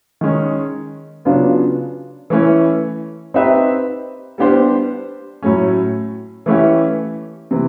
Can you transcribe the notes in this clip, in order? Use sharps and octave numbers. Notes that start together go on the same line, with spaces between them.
D#3 G#3 C#4
C#3 F#3 B3 D4 F4
E3 A3 C#4 E4
C4 D#4 G4 B4 E5
G3 B3 D4 G4 C5
A2 F#3 A3 C#4
E3 A3 C#4 E4 G4
C3 E3